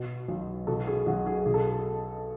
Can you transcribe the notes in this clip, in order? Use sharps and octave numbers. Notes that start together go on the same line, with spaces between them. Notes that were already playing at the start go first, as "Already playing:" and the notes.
Already playing: B2
B1
B2 A4
G#4
B1 F#4
G#4
B2 G#4
A4